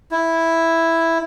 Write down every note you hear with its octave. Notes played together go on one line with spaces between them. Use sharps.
E4